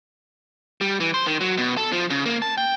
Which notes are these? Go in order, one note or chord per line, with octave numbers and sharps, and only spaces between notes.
G3
E3
C5
D#3
F#3
B2
A4
F3
C#3
A#3
A5
G5